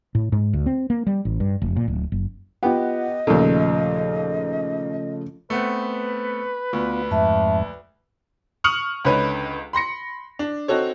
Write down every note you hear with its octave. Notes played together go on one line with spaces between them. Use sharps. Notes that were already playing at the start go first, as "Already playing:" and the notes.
A2
G#2
D2
C4
A#3
G3
A1
G2
F1
A#2
D1
F#1
B3 F4 G4 D#5 F#5
D#2 A#2 C#3 F3 A3
A3 B3 C4 B4
D2 B3 F4
F2 G#2 E5 A5
C#6 D#6 F6 C#7 F#7
C#2 D3 C#4 D#4 B4 C#5
B5 C6 A#6 C#7
D4
C4 D#4 F#4 A4 C#5